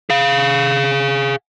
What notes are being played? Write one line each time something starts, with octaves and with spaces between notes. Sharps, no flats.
G#4 F5